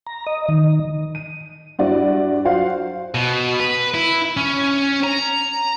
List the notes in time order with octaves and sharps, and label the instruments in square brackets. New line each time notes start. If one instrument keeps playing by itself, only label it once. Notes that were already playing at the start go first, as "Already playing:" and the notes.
[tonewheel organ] A#5
D#5
D#3
[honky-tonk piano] D#7
G2 E4 F#4 D5
F#3 F4 F#4 C5 F5 F#5
[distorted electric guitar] B2
B4
E4
C#4
A#5